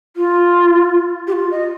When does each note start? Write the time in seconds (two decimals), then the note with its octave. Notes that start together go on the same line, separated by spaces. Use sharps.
0.16 F4
1.27 G4
1.32 F4
1.51 D#5